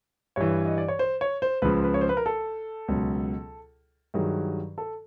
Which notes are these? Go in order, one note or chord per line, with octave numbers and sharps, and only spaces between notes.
G2 E3 C#5
D#5
D5
C#5
C5
C#5
C5
C#2 C#3 F3 B4
B4
C#5
C5
B4
A#4
A4
C#2 B2 F#3
G2 D#3 F#3 G#4
A4